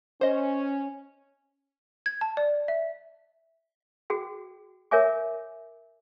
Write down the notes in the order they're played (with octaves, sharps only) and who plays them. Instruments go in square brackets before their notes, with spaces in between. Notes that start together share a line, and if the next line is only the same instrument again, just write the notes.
[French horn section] C#4 [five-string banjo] C5 D#5
[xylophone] G#6
A5
D5
E5
[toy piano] F#4 G#4 G5
A#4 C#5 E5 G#5 D6